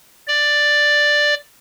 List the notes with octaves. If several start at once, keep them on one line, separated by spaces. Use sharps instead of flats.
D5